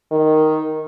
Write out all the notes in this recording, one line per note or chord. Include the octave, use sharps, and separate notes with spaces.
D#3